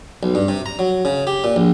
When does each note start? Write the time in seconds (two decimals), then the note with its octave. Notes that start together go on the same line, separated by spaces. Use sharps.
0.23 B1
0.35 G2
0.48 C3
0.66 A#5
0.79 F#3
1.05 C#3
1.27 G4
1.44 A#2
1.56 A#1